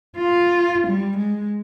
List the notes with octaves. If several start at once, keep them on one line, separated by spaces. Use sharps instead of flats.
F4
G3
G#3